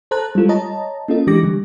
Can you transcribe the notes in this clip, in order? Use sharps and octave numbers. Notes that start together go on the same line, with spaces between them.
A4 C5 A5 A#5 F#6
G3 G#3 F4 A4
C#5 D#5 A5 A#5
A#3 C#4 F4 A4 D#5
E3 G#3 D4 G4 D6 A#6
D3 G3